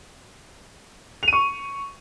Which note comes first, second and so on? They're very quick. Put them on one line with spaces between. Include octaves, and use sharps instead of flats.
F7 D#7 C#6